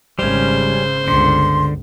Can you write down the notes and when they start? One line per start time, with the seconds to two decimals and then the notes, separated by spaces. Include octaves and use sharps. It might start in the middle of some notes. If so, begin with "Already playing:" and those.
0.19 G#1 C#3 G3 C#4 C5
1.08 G1 C#2 D3 C6